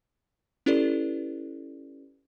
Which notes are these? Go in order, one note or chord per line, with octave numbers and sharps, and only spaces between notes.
C#4 E4 G4 A4 B4 D5